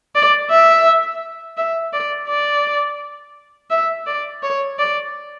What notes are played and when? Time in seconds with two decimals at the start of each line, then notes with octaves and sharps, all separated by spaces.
0.15 D5
0.51 E5
1.57 E5
1.93 D5
2.29 D5
3.71 E5
4.07 D5
4.43 C#5
4.79 D5